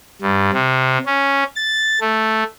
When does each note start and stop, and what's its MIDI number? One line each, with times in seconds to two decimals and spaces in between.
0.21 0.50 43
0.53 0.98 48
1.06 1.44 61
1.56 1.99 93
2.01 2.44 57